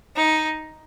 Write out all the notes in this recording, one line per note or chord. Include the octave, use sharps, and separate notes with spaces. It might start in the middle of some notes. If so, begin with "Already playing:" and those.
D#4